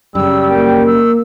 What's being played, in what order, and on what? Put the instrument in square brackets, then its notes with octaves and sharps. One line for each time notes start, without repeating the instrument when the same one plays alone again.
[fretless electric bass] F#2 C#3 [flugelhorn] G3 [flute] E6
[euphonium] A#3 [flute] G5
[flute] E6